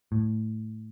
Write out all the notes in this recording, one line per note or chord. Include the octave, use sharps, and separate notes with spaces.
A2